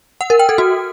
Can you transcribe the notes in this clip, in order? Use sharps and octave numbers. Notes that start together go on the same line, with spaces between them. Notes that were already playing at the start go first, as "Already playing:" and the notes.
F#5
A#4
G5
A4
F#4